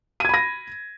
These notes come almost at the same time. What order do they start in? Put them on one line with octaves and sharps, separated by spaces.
D#7 G#6 B5 A#6